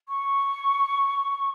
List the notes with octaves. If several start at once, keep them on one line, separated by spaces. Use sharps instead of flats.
C#6